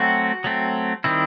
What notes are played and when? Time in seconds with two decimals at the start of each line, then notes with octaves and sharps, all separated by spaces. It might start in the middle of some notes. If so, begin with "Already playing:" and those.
Already playing: F#3 A3 C4 F#4
0.44 F#3 A3 C4
1.04 D#3 G3 C4 E4